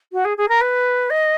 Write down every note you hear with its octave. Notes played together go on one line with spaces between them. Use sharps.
F#4
G#4
G#4
A#4
B4
D#5